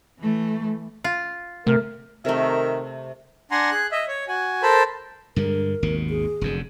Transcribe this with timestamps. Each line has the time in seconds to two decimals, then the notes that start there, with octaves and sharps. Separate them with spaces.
0.20 E3 A3
1.04 F4
1.67 C3 A3 A#4
2.25 C3 D#3 A3 A#4 E5
3.51 D4 F#5 G#5 A#5 C6
3.71 G#4 F#6
3.92 D#5 E5
4.08 C#5
4.28 F#4 G#5
4.63 A4 A#4 C5 A5 B5
5.36 G2 D3 G#3 A#4
5.83 G#1 D#2 B2
6.10 G#4
6.41 F1 F#2 D3